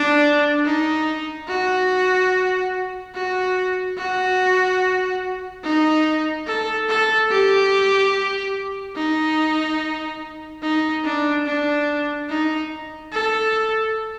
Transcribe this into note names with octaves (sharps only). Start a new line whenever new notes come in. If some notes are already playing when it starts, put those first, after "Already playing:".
Already playing: D4
D#4
F#4
F#4
F#4
D#4
A4
A4
G4
D#4
D#4
D4
D4
D#4
A4